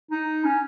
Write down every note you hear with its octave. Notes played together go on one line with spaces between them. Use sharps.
D#4
C#4